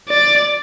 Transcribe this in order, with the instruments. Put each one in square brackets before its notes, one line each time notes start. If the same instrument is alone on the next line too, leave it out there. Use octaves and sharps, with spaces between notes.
[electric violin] D5